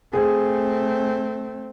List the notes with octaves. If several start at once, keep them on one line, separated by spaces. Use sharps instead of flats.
A3 C4 G#4